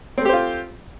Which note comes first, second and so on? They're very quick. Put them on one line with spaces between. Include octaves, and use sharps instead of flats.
C4 A3 G4 C5 F4